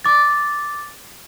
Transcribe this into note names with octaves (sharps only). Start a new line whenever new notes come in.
D6 A6